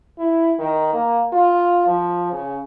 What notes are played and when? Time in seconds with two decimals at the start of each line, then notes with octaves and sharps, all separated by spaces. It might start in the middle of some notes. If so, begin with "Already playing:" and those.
0.19 E4
0.58 D#3
0.93 A#3
1.33 F4
1.87 F3
2.32 C#3